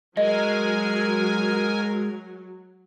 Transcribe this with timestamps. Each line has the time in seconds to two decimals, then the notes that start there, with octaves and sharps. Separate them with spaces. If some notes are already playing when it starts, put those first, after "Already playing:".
0.17 F#3 G#3 A#4 D#5 G#5